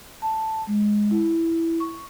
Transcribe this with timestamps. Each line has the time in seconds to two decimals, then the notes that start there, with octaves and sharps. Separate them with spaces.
0.22 A5
0.67 G#3
1.11 E4
1.80 C#6